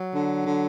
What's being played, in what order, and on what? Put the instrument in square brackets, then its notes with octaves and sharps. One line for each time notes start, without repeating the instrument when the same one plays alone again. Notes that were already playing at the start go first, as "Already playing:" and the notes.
Already playing: [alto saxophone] F#3
[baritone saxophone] D3
D3